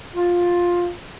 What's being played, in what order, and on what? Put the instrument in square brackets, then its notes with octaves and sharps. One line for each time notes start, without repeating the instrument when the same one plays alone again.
[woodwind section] F4